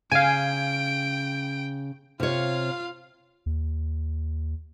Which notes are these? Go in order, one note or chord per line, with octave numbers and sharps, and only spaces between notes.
C#3 F5 G5 G#5 D7
C3 F4 C#5 F5
D#2